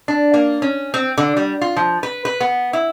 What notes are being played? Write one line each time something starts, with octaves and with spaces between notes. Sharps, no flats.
D4
A#3
C#4
C4
D3
G3
F4
F3
B4
B4
B3
E4